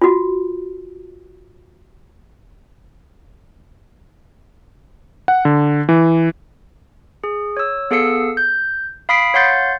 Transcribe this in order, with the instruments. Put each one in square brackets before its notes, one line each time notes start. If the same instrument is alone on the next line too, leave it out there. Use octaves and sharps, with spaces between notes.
[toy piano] F4 F#4
[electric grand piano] F#5
D3
E3
[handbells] G#4
C#5 E6
B3 G#4 A4 F5 E6 C#7
G6
F5 B5 D#6 B6 C7 D7
C#5 F5 F#5 C6 G6 A6